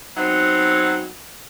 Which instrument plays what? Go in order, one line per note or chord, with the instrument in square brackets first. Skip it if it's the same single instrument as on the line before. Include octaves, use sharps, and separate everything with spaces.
[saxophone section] F#3 B3 C4 D#4 F#5